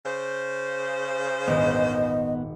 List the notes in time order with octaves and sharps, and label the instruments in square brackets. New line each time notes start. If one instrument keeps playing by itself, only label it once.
[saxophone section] C#3 C5
[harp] D#1 G#1 G#3 [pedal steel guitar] B3 [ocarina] D#5